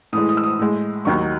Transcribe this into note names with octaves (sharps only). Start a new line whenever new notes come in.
A2 E3 G#3 D#6
D#6
E6
D#6
A2 G#3
D#2 D#3 F#3 C#6